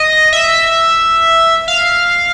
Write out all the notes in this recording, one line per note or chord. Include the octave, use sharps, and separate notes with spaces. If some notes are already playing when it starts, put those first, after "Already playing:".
Already playing: D#5
E5
F5